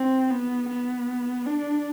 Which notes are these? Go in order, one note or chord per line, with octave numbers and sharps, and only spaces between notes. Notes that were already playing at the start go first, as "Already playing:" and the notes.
Already playing: C4
B3
B3
D4